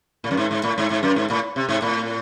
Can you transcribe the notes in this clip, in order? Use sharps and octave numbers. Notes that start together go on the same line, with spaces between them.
A2
F#2
G#2
G#2
A2
G#2
G#2
F#2
G#2
A2
C3
G#2
A2